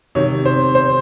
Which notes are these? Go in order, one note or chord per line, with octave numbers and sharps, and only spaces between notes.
C3 D#3 C#5
C5
C5